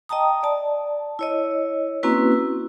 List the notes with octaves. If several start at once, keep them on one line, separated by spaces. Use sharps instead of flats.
D#5 G5 A5 A#5 D#6
D5 A5
E4 C#5 D#5
A#3 C4 C#4 E4 F#4 B4
E4